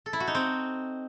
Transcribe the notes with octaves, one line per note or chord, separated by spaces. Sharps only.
A4
E4
F#4
D#4
C4